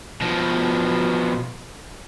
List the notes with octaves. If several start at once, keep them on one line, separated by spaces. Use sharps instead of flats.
B2 F3